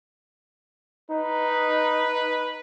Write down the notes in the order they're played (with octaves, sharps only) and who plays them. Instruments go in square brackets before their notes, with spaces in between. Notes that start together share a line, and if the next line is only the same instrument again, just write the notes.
[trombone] D#4 [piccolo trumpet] B4